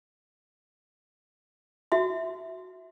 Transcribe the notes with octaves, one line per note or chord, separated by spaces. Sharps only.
F#4 E5 C6